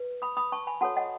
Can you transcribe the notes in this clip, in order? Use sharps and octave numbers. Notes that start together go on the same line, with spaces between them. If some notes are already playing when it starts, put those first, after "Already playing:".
Already playing: B4
B5 D#6
B5 D#6
A5 C#6
G#5 B5
F#4 A4 C#5 F#5 A5
D#5 F#5